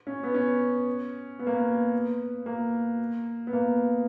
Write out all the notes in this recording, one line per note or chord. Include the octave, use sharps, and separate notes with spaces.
C#4
B3
C#4
B3
A#3
B3
A#3
B3
A#3